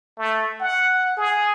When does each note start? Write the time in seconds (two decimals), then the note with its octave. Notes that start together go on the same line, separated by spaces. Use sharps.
0.18 A3
0.61 F#5
1.17 G#4